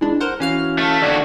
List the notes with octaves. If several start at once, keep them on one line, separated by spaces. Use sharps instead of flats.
E3 G#3 D4
A#4 C5 F#5
E3 C#4 F#4 F5 F6
A3
D#2 A3 D4 F#4 D5